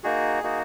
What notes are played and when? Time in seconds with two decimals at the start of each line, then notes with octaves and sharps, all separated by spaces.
0.03 A#3 D#4 F#4 G#4
0.43 A#3 D#4 F#4